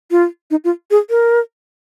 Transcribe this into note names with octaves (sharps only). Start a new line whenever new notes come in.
F4
D#4
F4
G#4
A#4